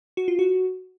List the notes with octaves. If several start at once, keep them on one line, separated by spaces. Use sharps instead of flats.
F#4
F4
F#4